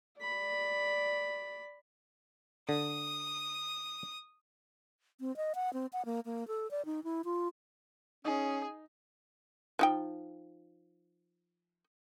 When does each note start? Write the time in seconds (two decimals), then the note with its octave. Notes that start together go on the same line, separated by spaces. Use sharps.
0.21 D5 B5
2.69 D3 D#6
5.20 C4
5.37 D#5
5.55 F#5
5.73 C4
5.93 F#5
6.05 A#3
6.25 A#3
6.48 A4
6.71 D5
6.85 D#4
7.04 E4
7.25 F4
8.25 C#4 D#4 G#4
9.79 F3 D#4 G5